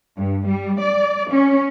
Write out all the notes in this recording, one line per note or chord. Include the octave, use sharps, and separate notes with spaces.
G2
G3
D5
C#4